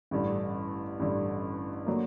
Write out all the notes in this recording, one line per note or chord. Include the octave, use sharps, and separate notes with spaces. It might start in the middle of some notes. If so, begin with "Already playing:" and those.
A1 G2 D3
A1 G2 D3
D3 F#3 A#3